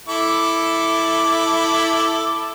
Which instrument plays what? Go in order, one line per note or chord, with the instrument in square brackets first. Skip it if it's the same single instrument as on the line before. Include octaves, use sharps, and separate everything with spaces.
[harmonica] E4 A4 D6